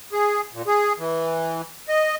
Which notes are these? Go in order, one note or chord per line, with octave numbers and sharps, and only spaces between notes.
G#4
A#2
G#4
E3
D#5